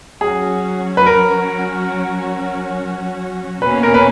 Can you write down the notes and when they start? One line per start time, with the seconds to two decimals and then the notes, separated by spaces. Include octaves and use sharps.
0.21 F#3 C#4 F#4 G#4
0.97 B4
1.06 A#4
3.62 B2 A#3 C#4 B4
3.83 A#4
3.94 B4